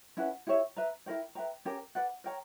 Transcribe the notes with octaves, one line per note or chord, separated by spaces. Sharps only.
C#4 E4 B4 F#5
E4 G4 C#5 E5
B4 E5 A#5
E4 A#4 C#5 G5
B4 E5 G5 A#5
C#4 G4 A#4
B4 D5 F#5
A#4 C#5 G5 A#5